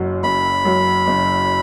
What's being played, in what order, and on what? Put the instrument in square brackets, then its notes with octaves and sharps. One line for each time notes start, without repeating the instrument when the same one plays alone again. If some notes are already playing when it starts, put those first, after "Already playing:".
Already playing: [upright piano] F#1 F#2 F#3
[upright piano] F#1 [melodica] B5
[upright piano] F#2 F#3
F#1